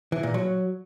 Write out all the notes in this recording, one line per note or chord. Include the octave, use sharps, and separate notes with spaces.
E3
A#2
F#3